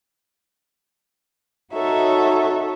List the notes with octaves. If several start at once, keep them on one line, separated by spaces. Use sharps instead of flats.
D#4 F#4 A4 C#5 E5